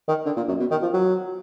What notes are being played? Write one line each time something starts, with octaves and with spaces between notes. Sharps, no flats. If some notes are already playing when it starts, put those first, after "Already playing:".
D#3
D3
A#2
F#2
B2
D#3
F3
F#3